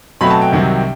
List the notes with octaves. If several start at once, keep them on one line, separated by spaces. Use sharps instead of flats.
B2 F#3 A3 C4 B5
A5
G5
C2 C3 D#3 F#3 C4